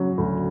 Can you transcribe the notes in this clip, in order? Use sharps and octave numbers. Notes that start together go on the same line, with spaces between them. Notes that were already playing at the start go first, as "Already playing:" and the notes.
Already playing: C#3 F#3
D2